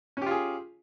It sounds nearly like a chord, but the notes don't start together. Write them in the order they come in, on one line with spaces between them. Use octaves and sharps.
C#4 G4 F4 G#4